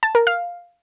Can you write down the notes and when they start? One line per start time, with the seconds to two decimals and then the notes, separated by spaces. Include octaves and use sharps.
0.03 A5
0.15 A#4
0.27 F5